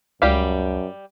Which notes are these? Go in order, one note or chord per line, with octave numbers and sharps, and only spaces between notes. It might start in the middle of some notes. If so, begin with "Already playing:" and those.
C#2 F#2 G3 G4 F5